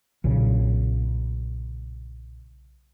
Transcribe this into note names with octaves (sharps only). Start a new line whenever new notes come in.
B1 A#2 C#3